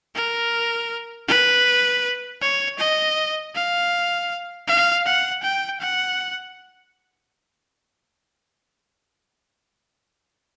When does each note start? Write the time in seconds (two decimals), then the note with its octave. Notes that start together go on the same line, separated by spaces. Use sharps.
0.15 A#4
1.28 B4
2.41 C#5
2.79 D#5
3.55 F5
4.67 F5
5.06 F#5
5.43 G5
5.80 F#5